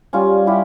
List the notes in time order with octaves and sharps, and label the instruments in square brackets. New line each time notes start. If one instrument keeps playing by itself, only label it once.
[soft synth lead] G3 [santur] C#4 F4
[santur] E4 G4